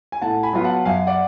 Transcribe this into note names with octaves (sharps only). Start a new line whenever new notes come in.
G#5
A2 F#5 A5
G#5 B5
F#3 B3 F4
F#5 A5
F#2 F5 G#5
D5 F#5